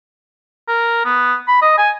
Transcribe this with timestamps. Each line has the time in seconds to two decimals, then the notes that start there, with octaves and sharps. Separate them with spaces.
0.68 A#4
1.05 B3
1.48 B5
1.61 D#5
1.78 G#5